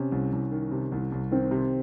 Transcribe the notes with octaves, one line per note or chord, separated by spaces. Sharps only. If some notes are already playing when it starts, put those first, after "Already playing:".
Already playing: C3 C#4
C2
C2
D#3
C3
C2
C2
D#3 C4
C3